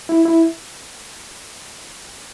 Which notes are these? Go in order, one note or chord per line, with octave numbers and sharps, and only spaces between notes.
E4
E4